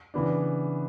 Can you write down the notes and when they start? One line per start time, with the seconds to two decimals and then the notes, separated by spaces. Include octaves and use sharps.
0.14 C#3 E3 B3 D4